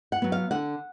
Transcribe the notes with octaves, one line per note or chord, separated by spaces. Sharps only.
F#5
F#3 B3
F5
D3 F#5